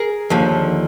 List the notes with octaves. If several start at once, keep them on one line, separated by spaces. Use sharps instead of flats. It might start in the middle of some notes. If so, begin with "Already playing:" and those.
Already playing: G#4 A#4
D#2 D3 F3